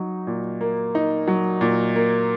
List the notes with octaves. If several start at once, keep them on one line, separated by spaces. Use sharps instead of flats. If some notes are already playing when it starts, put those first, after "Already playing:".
Already playing: F#3 D#4
A#2
A#3
D#4
F#3
A#2
A#3